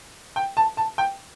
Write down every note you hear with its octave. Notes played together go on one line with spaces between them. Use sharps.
G5
A5
A5
G5